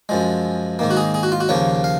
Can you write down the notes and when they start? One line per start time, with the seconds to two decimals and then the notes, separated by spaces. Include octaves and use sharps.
0.09 F#2 F3 G#3
0.79 G#2 D#3 A#3
0.90 F#4
0.97 G#4
1.14 G#4
1.23 F#4
1.32 F4
1.40 F#4
1.49 D#2 C#3 F3 A#3 C#5
1.84 F5